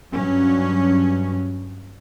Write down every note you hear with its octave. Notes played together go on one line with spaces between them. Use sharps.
G2 F#3 C#4